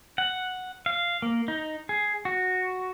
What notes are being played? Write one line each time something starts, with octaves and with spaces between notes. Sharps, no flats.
F#5
F5
A#3
D#4
G#4
F#4